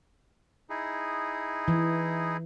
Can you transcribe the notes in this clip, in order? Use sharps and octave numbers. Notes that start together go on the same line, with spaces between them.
D#4 E4 G#4
E3